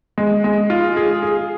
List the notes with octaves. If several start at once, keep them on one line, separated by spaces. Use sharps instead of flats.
G#3
G#3
F4
G#4
G#4